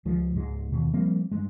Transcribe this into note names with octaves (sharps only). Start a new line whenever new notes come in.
C#2 F3 G#3
C#2 G#2 G#3
D#2 B2
F3 G3 A#3 C4
G2 G#3